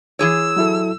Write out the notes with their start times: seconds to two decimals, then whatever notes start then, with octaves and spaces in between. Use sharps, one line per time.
0.19 E3 G#4 C#5 E6
0.57 F#3 E4 A4